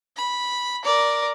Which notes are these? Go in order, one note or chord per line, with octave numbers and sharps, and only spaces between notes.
B5
A#4 D5